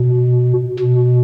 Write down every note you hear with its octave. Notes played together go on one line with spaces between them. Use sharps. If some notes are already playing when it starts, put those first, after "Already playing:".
Already playing: B2
B2